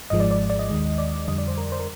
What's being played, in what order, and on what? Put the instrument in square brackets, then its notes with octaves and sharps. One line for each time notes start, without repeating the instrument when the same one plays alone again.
[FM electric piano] G#1 G#2 F3 G#3 D#5
D5
D5
D5
D#5
D#2 D#3 G#3
D5
F2 D3 G3 D#5
D5
C5
A#4
C5
A#4